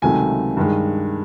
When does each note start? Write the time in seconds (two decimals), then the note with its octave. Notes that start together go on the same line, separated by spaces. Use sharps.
0.02 C#2 C3 D#3 F#3 A3 G#5
0.57 G2 D#3 G#3